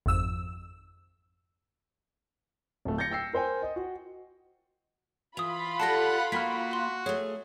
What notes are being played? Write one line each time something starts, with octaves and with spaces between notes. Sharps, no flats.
G#1 F2 E6
D1 A3
G6 A6 A#6 C#7
G5 E6 C7
A#4 C5 G5 G#5
D#5
F#4
E3 F4 B5 D#6 F7
G4 A4 D5 F#5 A5 A#6
A#3 D#4 F#4 G5 F6 B6
C6 F#6
A3 G#4 C#5